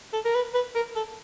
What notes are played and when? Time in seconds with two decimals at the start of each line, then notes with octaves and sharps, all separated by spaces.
0.13 A4
0.25 A#4
0.35 B4
0.55 B4
0.75 A#4
0.96 A4